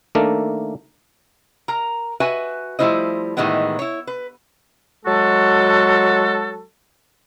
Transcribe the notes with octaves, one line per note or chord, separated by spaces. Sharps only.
D#3 A3 A#3 D4 A4 A#4
A#4 A#5
F#4 B4 E5 G#5
F3 G3 A3 E4 C5 D#5
A2 D#3 E3 G3 G#3 B3
E4 C#5
B4
F#3 G#3 F#4 A4